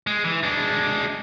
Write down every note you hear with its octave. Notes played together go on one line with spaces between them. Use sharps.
G#3
E3
G#3 D4